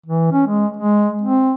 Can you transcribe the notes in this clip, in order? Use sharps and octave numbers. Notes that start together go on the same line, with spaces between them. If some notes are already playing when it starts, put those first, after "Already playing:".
E3
C#4
G#3
G#3
C4